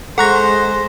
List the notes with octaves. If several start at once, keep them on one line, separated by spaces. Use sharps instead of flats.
G#3 A4 C5 F#5 A#5 C#6 F#6 A#6